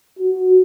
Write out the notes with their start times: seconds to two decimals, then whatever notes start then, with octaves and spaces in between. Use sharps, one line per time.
0.19 F#4